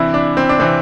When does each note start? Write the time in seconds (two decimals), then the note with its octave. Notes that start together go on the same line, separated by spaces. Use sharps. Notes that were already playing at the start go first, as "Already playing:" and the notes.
Already playing: C3 E3 D4 E4
0.14 D4
0.37 C4
0.49 D4
0.60 C3 E3 C4